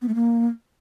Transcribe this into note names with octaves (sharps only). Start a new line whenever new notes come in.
B3
A3
A#3